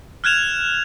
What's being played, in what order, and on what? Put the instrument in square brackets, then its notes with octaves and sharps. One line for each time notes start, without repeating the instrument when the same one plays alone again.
[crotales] F6 F#6 G#6 E7 F7